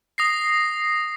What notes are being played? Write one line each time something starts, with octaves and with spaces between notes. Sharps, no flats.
D#6 A#6 C7